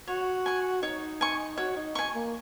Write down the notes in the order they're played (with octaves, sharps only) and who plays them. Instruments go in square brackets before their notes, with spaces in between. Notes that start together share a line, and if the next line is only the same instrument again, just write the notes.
[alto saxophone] F#4 [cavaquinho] C#5
[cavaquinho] G#5 C#6
[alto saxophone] D#4 [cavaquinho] C#5
[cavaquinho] G#5 C#6
[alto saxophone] F#4 [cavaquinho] C#5
[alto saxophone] D#4
[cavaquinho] G#5 C#6
[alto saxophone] A#3